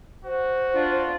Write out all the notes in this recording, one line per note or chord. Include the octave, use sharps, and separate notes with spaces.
F#4 C5
D4 F4 D5